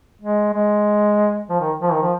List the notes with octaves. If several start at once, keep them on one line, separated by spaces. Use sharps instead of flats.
G#3
G#3
F3
D#3
F3
D#3
F3